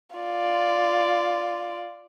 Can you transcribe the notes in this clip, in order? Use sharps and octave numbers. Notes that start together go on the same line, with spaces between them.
F4 D5